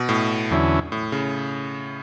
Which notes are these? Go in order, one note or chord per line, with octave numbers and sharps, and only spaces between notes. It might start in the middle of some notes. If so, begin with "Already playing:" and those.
Already playing: B2
A2
E2 D3 F#3 C#4 E4
A2
C#3